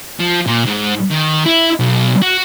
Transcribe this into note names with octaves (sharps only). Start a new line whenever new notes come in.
F3
A#2
G#2
D#3
E4
B1
F#4